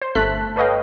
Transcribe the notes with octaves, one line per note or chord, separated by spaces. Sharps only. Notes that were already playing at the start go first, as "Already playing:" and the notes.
C5
G1 A3 A4 A5 F#6 B6
A4 B4 C#5 D#5 F5 G5